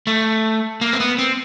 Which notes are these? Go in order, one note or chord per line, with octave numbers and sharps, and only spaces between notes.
A3
A#3
C4
B3
C4